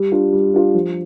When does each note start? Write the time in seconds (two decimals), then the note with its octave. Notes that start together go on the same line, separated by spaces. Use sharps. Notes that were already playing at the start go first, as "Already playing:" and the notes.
Already playing: G3
0.12 D4 F4
0.33 G3
0.54 D4 F4
0.74 F3